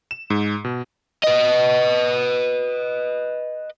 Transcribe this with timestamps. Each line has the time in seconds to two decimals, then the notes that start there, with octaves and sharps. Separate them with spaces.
0.11 E7
0.30 G#2
0.64 B2
1.23 B4 D#5